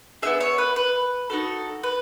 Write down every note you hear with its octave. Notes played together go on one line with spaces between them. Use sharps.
B3 D#4 G#4 E5
C#5
B4
B4
D#4 F#4 A4
B4